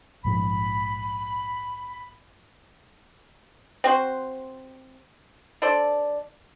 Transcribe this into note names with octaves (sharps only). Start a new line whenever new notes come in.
A#1 G#2 F3 B5
C4 F#4 C5
D4 A4 C5 D5